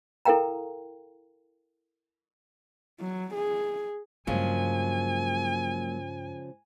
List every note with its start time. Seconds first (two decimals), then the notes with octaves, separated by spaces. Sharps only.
0.25 E4 A4 A#4 F5 G5 A#5
3.00 F#3
3.34 G#4
4.27 G2 C#3 F3 F#3 G#3 A#3 G#5